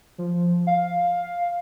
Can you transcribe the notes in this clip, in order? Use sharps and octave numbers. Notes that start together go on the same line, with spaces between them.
F3
F5